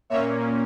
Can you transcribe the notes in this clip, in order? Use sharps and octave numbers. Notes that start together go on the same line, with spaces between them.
A#2 A#3 C#4 C#5 E5